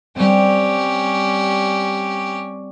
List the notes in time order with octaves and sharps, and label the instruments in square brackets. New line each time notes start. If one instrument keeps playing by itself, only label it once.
[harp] G3 C4 [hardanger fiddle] C#4 G4